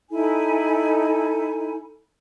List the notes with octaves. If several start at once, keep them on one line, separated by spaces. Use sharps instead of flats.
D#4 E4 A4 G#5